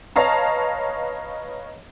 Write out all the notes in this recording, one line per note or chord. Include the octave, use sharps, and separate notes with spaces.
B4 C#5 D#5 F5 A5 A#5